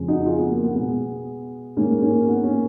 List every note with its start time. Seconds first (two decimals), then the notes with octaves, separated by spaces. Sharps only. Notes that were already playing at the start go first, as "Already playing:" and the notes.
Already playing: F2 C#3 G#3
0.08 D#4 F#4
0.26 F4 G#4
0.39 B3
0.51 A#3
0.64 B3
0.76 B2 G#3 B3
1.77 G#2 D#3 G#3 A#3 C#4
2.02 A#3 C#4
2.28 B3
2.44 A#3 C#4